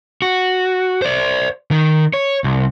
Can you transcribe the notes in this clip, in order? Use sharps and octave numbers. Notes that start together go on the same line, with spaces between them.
F#4
C5 D5
D#3
C#5
C2